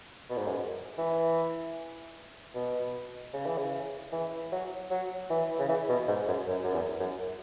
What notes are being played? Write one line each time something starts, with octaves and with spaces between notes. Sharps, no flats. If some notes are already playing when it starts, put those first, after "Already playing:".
B2
G#2
F#2
E3
B2
C#3
E3
C#3
E3
F#3
F#3
E3
C#3
E3
B2
G#2
F#2
F#2
F#2
E2
F#2